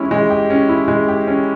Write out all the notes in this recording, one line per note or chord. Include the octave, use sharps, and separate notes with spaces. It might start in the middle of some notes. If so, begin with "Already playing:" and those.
Already playing: G#3 C#4 E4 G4
G#3
G4
C#4
E4
G#3
G4
C#4